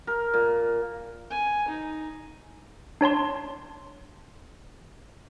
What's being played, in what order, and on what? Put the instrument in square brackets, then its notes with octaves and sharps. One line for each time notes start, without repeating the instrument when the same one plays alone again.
[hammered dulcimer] A#4
A#2
[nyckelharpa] G#5
D#4
[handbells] D4 C#5 A5 C6